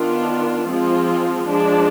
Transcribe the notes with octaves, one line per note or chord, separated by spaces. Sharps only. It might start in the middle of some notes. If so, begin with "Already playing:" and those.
Already playing: D#3 B3 D4 F4
F3 G#3 C4 F4
F3 G#3 D4